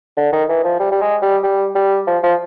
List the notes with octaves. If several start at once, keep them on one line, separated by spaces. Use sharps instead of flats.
D3
D#3
E3
F3
G3
G3
G#3
G3
G3
G3
F3
F3